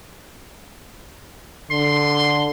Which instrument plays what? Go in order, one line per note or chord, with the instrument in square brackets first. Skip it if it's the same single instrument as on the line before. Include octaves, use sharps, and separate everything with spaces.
[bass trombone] D3 [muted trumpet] C6